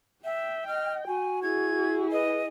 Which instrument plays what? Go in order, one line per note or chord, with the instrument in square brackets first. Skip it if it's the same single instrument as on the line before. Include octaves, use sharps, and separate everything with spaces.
[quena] E5 [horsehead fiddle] G5
[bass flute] D#5 [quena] F6
[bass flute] F#4 [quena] G#5
[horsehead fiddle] E4 G#4 [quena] G#6
[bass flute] B4 [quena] D#5